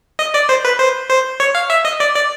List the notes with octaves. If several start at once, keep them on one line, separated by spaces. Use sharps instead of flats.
D#5
D5
C5
B4
C5
C5
C#5
F5
E5
D#5
D5
D5